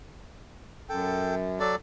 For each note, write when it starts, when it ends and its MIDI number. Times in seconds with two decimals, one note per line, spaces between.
0.89 1.59 42
0.89 1.35 69
0.89 1.35 79
1.60 1.76 54
1.60 1.76 69
1.60 1.76 74